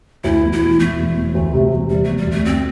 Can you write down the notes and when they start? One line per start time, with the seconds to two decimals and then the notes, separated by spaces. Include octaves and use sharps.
0.24 D2 E4
0.43 E1
0.52 E4
0.62 E1
0.80 E1 A3
0.99 E1
1.16 E1
1.35 D2
1.53 C3
1.72 E1
1.90 C3 G3
2.04 E1 A3
2.17 G3
2.27 D2 A3
2.45 D2 C4